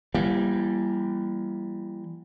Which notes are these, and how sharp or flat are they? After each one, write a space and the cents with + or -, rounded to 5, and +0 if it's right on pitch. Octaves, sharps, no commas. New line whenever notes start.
E3 +30 G3 +0 A#3 +35